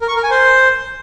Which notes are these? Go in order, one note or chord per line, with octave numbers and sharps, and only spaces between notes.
A#4
C#6
A#4
G#5
C5